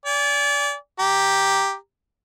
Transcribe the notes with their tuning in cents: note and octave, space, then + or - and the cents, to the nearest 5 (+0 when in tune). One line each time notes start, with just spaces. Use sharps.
D5 -30 G#5 -25
G4 +0 A#5 +0